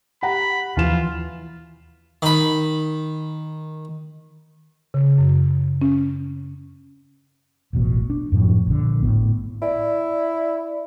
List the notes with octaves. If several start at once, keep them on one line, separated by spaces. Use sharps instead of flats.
G4 F#5 A#5 B5
D#2 E3 F3 F4 E7
D#3 B5
C#3
F#2
C#4
E1 A1 B2
D4
F#2 A2 F3
A#1 D3
G#1 A2 B3
E4 D5